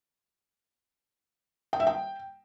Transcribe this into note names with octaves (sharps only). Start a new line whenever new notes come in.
G5
E5
G5